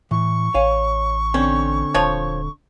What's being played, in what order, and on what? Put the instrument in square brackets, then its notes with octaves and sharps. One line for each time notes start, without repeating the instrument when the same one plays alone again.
[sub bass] A2 [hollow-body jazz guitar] E3 [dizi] C#6
[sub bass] A1 [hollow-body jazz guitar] C#5 F5 G#5
[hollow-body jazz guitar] D3 C4 [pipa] C#4
[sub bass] D#1 [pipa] F3 C#5